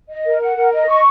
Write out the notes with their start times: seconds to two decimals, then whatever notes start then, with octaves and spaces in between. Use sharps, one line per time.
0.10 D#5
0.26 A#4
0.42 F#5
0.57 A#4
0.73 D#5
0.88 C#6